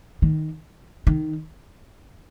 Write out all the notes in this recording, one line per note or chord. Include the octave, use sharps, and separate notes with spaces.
D#3
D#3